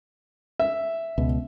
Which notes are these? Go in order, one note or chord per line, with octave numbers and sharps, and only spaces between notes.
E5
C#2 B2